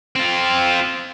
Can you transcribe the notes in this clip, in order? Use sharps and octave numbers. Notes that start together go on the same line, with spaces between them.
C4 F4